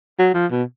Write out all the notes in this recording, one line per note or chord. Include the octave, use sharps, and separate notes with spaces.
F#3
F3
B2